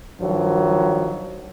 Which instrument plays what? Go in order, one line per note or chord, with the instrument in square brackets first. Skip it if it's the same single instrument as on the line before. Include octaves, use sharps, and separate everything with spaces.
[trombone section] G2 D#3 F3 F#3